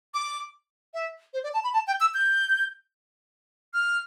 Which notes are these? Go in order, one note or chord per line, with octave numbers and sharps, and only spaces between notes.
D6
E5
C5
D5
A5
B5
A5
G5
E6
G6
F6